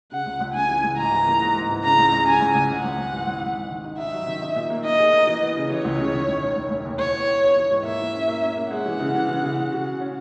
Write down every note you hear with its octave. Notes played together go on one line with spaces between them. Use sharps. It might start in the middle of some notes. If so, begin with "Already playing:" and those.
C#3 F#5
C#2
C#2
C#3 G#5
E3
C#2
G#2 A#5
E3
A#3
G#2
G#2
E3
C#3 A#5
C#2
G#3
C#3 G#5
C#2
C#2
G#1 F#5
G#1
G#1
E3
G#1
G#1
D#4
D#3
D#4
D#4 E5
F#3
D#3
D#4
A#2
A#3
D#4 D#5
G#4
A#3
E3
B3
C#3
E3 C#5
C#2
C#3
D#3
E1
D#3
E1
E1
D#2
E4 C#5
B3
B3
B3
E3
G#2
A#3 E5
E4
C#4
A#3
C#4
A#3
G#3 F#5
E3
C#3
E3
E3
C#3
C#3
F#4
F#4
C#4